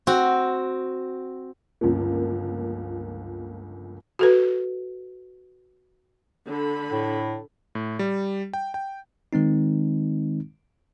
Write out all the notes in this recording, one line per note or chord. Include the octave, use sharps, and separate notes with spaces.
C4 F#4
G1 C#2 F3 A#3
F#4 A4 B4
D3 B5
A2
A2
G3
G5
G5
D#3 G#3 C4 D#4